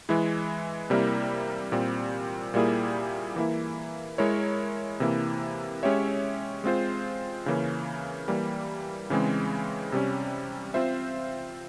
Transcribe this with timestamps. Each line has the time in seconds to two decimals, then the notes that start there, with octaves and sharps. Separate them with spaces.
0.09 E3 G#3 E4
0.90 C3 G3 A#3 E4 A#4
1.72 A#2 G3 C4
2.54 A#2 G3 A#3 E4 G#4
3.36 E3 A#3 E4
4.18 G#3 E4 A#4 C#5
5.00 C3 E3 A#3 E4
5.83 G#3 C#4 G4 C#5 E5
6.64 G#3 C4 F4 C5
7.46 C#3 E3 A#3 C#4
8.28 E3 G3 A#3
9.10 C#3 E3 G#3 C4
9.92 C3 G3 C#4
10.74 C4 F4 C5 E5